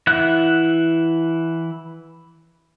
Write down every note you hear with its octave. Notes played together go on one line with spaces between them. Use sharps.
E3 E4 E5 F#5 F#6